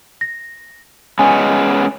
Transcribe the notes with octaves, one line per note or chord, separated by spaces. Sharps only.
A#6
G#3 B3 C#4 G#5